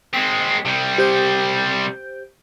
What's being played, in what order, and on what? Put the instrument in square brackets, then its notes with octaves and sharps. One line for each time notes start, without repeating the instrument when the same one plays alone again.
[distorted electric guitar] G#3 C4 [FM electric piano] B6
[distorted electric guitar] C3 G3
[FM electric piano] G4 C5 G6